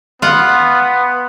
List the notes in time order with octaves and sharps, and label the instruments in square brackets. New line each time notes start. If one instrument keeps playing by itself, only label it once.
[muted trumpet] B3 [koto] F4 F#5